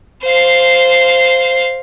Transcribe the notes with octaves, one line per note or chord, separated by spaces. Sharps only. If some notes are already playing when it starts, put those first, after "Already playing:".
C5 F5